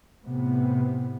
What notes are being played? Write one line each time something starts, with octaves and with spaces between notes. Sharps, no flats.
A2 C3 B3